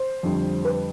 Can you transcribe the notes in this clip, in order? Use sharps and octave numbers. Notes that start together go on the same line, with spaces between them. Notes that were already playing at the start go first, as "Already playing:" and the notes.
Already playing: C5
F2 D3 G3
B4